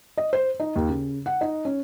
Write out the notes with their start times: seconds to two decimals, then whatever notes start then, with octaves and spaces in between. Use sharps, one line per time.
0.17 D#5
0.33 C5
0.60 D#4
0.76 D#2
0.89 C#3
1.26 F#5
1.41 D#4
1.65 C#4